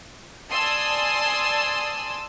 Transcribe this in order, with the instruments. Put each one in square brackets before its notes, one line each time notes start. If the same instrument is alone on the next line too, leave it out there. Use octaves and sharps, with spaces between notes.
[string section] D5 G#5 A5 C6 D#6 E6